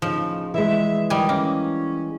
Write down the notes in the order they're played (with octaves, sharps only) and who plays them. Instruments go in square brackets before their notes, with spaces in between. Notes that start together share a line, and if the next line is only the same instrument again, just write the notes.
[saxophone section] A2 C#3 D#4 [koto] F3
[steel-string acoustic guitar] E3 G#3 [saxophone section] E5
[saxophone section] D#3 E4 D#5 [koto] G3 G#5
[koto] A#3 [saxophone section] C#4